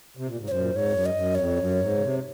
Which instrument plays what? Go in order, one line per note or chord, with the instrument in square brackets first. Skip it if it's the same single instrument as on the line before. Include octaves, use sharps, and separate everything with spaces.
[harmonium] C3
A#2
G#2
[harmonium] F#2 [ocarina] C#5
[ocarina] C5
[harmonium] A#2
G#2
[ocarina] C#5
[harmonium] F2
F#2
[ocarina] D#5
[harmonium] F#2
[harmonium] F2 [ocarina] C#5
[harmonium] F#2
G#2
C#3
C3